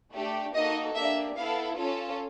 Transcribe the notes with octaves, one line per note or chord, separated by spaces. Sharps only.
A3 D4 G4
A#3 D#4 F#4 A4 D#5
A#3 D4 G4 E5
B3 E4 A4 F5
C#4 F4 A4